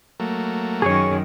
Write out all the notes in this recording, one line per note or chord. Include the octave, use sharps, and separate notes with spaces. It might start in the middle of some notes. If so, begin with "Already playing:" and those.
F#3 A3 A#3
F#2 D#3 G#4 C#5 C#6